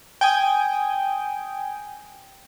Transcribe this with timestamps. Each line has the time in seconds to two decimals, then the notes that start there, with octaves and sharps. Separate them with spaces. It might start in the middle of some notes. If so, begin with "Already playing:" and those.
0.21 G5 G#5 D#6